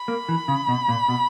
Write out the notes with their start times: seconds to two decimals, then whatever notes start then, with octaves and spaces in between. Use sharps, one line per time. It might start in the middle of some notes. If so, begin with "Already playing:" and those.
Already playing: B5
0.08 A#3
0.29 E3
0.48 C#3
0.68 B2
0.89 A#2
1.08 B2